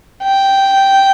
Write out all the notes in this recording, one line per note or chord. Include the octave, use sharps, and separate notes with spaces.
G5